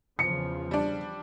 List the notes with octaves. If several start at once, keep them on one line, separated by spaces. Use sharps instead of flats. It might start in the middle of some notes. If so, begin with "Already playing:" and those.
E2 C#3 F3 C#7
G3 D4